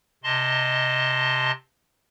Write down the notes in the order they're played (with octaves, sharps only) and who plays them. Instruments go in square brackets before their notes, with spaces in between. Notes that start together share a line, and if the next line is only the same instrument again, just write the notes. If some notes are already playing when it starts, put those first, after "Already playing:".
[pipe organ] C3 D#5 A5 C6